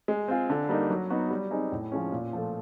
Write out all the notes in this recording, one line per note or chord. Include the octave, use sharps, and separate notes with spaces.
G#3
C4 F4 G#4
D3
G3 A#3 D#4
F#3
B3 D#4 F#4
G3
C4 D#4 G#4
A2
F3 G#3 C#4
A#2
F3 A3